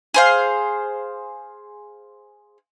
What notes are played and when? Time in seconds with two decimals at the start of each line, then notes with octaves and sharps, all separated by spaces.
0.14 G#4 C5 F5